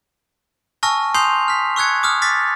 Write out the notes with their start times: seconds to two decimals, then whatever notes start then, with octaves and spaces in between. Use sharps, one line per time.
0.83 G#5 A5 C#6 E6 F6 A#6
1.15 G#5 C6 D#6 G6 C7 F7
1.48 F6 B6
1.76 C#6 E6 F#6 G#6 C#7
2.03 D6 D#6 F6
2.22 D6 F6 A6 B6